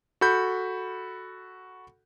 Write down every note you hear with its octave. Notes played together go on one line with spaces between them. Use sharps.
F#4 A4 B5 G6